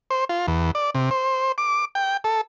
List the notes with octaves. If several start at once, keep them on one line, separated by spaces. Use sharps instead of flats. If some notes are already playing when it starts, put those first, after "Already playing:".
C5
F4
E2
D5
C3
C5
D6
G5
A4